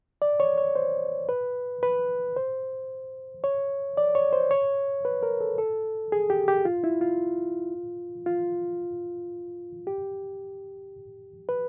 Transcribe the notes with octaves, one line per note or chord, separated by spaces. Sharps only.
D5
C#5
C#5
C5
B4
B4
C5
C#5
D5
C#5
C5
C#5
B4
A#4
A4
A4
G#4
G4
G4
F4
E4
F4
F4
G4
B4